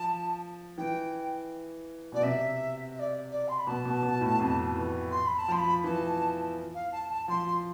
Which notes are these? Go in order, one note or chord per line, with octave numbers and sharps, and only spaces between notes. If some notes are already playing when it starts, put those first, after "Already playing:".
Already playing: F3 A5
E3 G5
B2 D5
C3 E5
E5
D5
D5
C6
B5
B2 A5
B2
B2
A2
F2
E3
C6
B5
A5
F3 C6
B5
E3 A5
F5
A5
A5
F3 C6